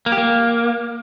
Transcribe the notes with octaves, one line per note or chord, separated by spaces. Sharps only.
A#3
G4
A#3